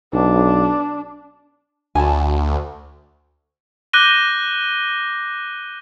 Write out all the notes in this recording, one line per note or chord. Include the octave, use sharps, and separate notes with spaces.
B1 D4
D2 G#5 A5
D6 F#6 G6 A#6 D#7 G7